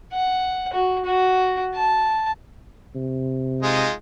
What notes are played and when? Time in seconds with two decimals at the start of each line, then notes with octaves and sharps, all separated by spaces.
0.13 F#5
0.73 F#4
1.05 F#4
1.75 A5
2.95 C3
3.63 G#3 D#4 F4